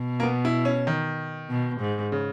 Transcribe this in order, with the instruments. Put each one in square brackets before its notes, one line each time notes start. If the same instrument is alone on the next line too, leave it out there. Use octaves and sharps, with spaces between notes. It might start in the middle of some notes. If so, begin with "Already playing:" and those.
Already playing: [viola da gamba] B2
[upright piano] A#3
B3
E4
C#4
D#3
[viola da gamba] B2
G#2
[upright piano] C#3